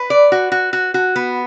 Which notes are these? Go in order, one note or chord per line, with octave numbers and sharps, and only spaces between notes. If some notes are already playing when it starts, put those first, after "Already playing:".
Already playing: B4
D5
F#4
F#4
F#4
F#4
B3